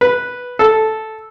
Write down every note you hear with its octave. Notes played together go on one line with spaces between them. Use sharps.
B4
A4